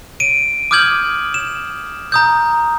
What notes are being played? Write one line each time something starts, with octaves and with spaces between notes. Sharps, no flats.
D7 D#7
D6 D#6 F6 G6 G#6 F#7
E7
A#5 D#6 G6